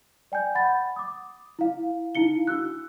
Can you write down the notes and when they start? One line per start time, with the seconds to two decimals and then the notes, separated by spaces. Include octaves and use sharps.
0.32 D5 G5 G#5 G6
0.55 F#5 B5 A6
0.96 D6 D#6
1.59 E4 F5
2.15 D#4 E4 F5 C#7 G7
2.47 D4 F#4 E6 F#6